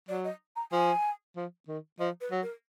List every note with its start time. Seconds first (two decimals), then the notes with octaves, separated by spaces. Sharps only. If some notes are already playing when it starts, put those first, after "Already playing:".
0.08 F#3 D5
0.24 D#5
0.56 A#5
0.72 F3 G#5
1.36 F3
1.68 D#3
1.99 F3 D#5
2.21 B4
2.31 F#3
2.42 A#4